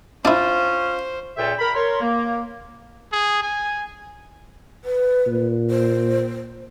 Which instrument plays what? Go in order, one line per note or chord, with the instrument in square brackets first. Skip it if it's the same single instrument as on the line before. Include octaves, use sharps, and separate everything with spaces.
[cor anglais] C#4 [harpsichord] D4 E4 [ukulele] F4 [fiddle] C5
[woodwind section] C#2 A#2 G#4 A4 E5 G5
A#4 B5
A#4 C#5 C6
A#3
[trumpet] G#4
G#5
[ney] B4
[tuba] A#2
[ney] C5